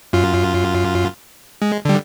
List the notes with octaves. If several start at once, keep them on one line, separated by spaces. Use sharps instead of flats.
F#2 F4
G#3
D3 G3